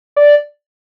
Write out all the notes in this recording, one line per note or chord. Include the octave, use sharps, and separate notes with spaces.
D5